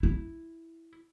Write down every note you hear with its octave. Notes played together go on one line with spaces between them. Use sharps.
E4